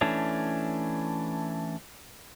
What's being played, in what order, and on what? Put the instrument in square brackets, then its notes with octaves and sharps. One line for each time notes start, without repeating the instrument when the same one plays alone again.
[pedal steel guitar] E3 A3 C#4 D4